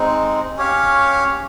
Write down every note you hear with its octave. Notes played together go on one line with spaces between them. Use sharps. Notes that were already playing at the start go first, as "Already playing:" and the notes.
Already playing: G#3 C4 D#4
C#4 G4 C#5 F5